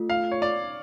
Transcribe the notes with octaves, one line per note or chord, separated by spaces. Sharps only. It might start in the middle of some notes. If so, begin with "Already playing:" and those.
Already playing: A3 F4 A4
F5
C#5
D5